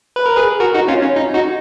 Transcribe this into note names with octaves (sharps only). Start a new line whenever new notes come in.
B4
A#4
G#4 B4
F#4 A#4
D#4 F#4
C#4 F4
C#4
D#4
D#4 F#4